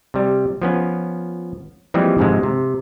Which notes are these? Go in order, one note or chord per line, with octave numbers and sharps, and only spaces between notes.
C3 G3
F3 B3 C#4
E3 F3 G3 G#3 A#3 C4
F2 G#2 C3 F3 G#3
C3